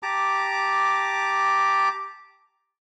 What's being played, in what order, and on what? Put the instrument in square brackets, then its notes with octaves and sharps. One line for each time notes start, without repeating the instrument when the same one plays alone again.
[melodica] G4 A5 A#5 D6